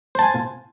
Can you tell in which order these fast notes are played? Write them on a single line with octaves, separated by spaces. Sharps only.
C5 A5 G#5